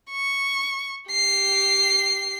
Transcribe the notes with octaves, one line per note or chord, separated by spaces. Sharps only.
C#6
G4 C7